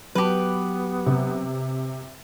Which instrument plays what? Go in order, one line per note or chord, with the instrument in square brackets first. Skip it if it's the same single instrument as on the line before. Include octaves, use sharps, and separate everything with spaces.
[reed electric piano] F#3 D6 [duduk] B3 [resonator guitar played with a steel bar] G4 B4
[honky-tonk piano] C3